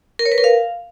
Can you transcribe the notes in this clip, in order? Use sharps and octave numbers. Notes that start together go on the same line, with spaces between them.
A#4
C#5
B4
A#4
F5